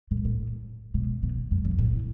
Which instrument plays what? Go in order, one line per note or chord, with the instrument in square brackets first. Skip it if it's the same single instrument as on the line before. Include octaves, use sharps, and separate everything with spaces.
[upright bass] A2
A2
B2
B2
F#2
F#2
A2
E3